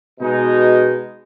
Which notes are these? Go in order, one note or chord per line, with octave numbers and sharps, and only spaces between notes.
B2 G#3 D#4